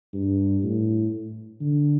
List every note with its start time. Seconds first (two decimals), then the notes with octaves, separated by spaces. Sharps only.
0.13 G2
0.63 A2
1.61 D3